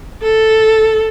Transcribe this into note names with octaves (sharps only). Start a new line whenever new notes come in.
A4